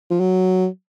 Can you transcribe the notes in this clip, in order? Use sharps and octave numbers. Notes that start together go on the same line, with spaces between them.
F3
F#3